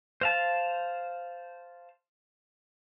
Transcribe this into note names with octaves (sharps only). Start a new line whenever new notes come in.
C5 F5 A5